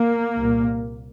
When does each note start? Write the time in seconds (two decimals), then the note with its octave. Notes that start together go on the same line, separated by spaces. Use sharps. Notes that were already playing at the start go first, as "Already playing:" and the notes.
Already playing: A#3
0.37 C2 A#2